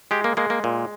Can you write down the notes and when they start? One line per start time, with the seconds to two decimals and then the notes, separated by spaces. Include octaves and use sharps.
0.11 G#3 G4
0.24 A#3
0.37 G#3 A#3
0.50 A#3
0.64 A#2